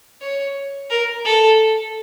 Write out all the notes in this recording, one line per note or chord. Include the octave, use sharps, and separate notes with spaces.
C#5
A#4
A4